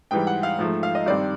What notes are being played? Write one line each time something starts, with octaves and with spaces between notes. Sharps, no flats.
G#2 E3 G3 G5
F#5
F5
G#2 F3 A3
F5
D#5
G2 D#3 G3 C4 D5